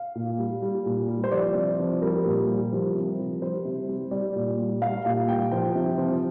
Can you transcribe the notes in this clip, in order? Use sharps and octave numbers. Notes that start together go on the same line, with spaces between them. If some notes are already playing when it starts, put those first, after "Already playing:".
Already playing: F5
A#2
G3
G3
A#2
G3
C5
F3 D5
C3
F3
G3 A#4
A#2
G3
F3
C3
F3
G3 C5
C3
G3
G3 D5
A#2
G3
G3 F5
A#2 F5
G3 G5
F3 G5
C3
F3